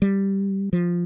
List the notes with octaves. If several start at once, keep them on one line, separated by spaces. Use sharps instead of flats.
G3
F3